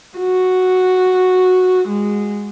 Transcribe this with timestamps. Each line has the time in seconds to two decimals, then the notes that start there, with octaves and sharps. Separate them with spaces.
0.18 F#4
1.88 G#3